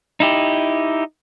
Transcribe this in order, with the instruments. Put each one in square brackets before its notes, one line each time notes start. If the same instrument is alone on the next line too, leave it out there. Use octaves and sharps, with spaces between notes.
[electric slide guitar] D#4 E4 G4